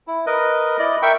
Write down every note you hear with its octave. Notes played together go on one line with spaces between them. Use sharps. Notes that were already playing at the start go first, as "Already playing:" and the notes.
E4
A#4 B4 D#5
E4 D5 D#5
A#4 E5 G5 C#6